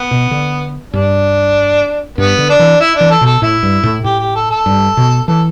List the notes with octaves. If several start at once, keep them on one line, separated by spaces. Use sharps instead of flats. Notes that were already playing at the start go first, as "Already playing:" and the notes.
Already playing: B3
B2
D3
G2 D4
G2 B3
D3
D4
E3
E4
E3 D4
A4
B2 A4
A2 E4
G2
A2
A2 G4
G4
A4
A4
G2
B2
E3 A4